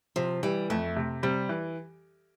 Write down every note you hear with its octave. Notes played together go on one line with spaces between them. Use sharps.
C3 F3
E3 G3
F2 A3
C3
C3 G3
E3